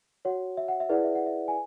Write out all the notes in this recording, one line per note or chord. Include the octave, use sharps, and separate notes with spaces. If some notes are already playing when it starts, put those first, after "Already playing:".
F#4 C#5 F#5
E5
F#5
E5
E4 G#4 B4 D5 F#5
E5
F#5
E5
G#5